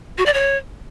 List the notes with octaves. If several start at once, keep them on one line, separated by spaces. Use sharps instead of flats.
F#4
D5
C#5